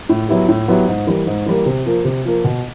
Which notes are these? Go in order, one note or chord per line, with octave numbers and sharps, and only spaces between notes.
A2
F#3 B3 E4 G4
A2
F#3 B3 E4 G4
G#2
E3 G3 A#3
G#2
E3 G3 A#3
C3
F3 A#3
C3
F3 A#3
B2